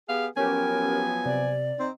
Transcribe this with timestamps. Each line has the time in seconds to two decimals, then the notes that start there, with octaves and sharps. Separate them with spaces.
0.09 B3 G4 G#4 F5
0.37 F3 F#3 B3 C#4 G4 A#4 G#5
1.26 C3 D5
1.78 C4 D#4